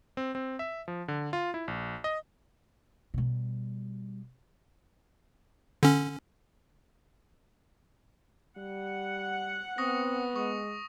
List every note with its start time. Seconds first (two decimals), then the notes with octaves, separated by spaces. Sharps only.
0.17 C4
0.35 C4
0.59 E5
0.88 F3
1.08 D3
1.33 F4
1.54 E4
1.68 A#1
2.04 D#5
3.14 B2 G3
5.83 D3 C#4
8.58 G3 F#5
9.78 B3 C4 C#6 D#6 A#6
10.36 G#3 C#6 D#6